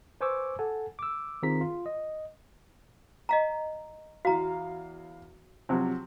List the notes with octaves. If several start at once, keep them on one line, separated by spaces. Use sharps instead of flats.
B4 C5 G#5 C#6 D6 E6
A4 F#5 G#5 A5
D6 E6
D#3 C4 F4 G#4 A#5 B6
F4
D#5
D#5 F5 A#5
E2 F#4 F5 A#5
C3 F3 F#3